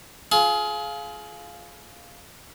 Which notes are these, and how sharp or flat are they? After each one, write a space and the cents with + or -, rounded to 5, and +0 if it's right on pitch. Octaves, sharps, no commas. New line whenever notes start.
F4 +0 G#4 +30